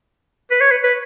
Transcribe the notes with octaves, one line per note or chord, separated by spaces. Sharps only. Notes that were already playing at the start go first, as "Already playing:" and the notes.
B4
C#5
B4
B4